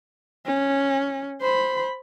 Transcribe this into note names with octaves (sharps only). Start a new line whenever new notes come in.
C#4
C5 B5